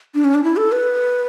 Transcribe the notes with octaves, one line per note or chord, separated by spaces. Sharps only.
D4
C#4
D4
E4
A4
B4